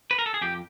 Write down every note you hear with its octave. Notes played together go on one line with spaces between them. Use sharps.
B4
A#4
A4
G#4
F2 G4